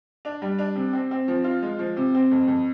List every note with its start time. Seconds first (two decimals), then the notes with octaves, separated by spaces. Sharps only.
0.25 D4
0.42 G3
0.58 D4
0.75 C3
0.93 C4
1.11 C4
1.28 F3
1.44 F4
1.62 G#3
1.79 F3
1.97 C3
2.14 C4
2.31 F2
2.48 F2